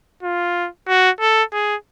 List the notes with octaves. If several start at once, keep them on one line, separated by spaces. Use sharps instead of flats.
F4
F#4
A4
G#4